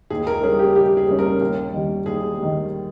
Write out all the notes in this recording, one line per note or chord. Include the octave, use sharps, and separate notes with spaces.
D#2 G#4
A#4
C#3 G3 C#4 G#4
G4
D#2 G4
G#4
C#3 G3 C#4
A#4
D#2
D#3 G3
D#2 G#4
D#3 G3